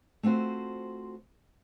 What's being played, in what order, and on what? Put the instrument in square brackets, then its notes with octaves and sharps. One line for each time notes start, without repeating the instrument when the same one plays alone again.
[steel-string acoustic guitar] A3 C4 F4 F#4 C5